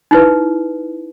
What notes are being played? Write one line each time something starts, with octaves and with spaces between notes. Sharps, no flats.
D#4 E4 B4